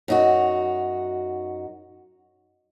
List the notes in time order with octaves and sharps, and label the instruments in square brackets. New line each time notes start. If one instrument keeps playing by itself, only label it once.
[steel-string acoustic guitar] F#2 D#4 F#4